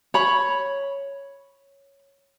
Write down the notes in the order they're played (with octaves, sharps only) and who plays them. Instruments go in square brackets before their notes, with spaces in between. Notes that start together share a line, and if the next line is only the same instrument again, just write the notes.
[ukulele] C#5 B5